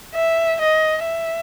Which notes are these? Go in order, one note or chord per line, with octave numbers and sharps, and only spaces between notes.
E5
D#5
E5